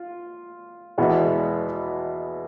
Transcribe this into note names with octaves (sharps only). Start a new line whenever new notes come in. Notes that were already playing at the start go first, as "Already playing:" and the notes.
Already playing: F4
E2 B2 G#3 B3